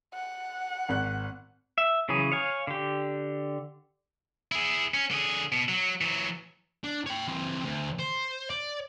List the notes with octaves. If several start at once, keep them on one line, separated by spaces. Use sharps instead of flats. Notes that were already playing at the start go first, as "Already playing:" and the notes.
F#5
G#1 F#6
E5
C#3 E3 F#3 G#4
C#5 F5 G#5
D3 G4
E4 G#4
C#4
D3 G#4
B2
F#3
E3 F#3
D4
C#5 G5
E3 C4
D2
C5
D5